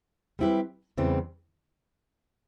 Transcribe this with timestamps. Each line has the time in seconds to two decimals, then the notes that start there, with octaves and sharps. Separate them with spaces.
0.39 G3 C4 E4 G4 B4
0.97 E2 C#3 E3 G3 C4